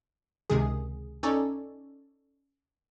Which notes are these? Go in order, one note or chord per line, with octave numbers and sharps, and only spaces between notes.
C#2 C3 D#3 G#4
C#4 D#4 A4 C#5 D5